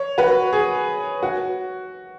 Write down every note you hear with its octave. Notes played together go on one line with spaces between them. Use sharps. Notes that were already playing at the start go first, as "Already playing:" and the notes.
Already playing: C#5
F#4 B4
G#4
F#4